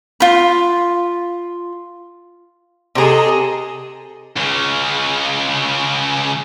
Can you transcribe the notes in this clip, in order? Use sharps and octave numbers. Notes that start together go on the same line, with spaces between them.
F4 B5
C3 G#4 A4 D#5 A#5
C#2 C#3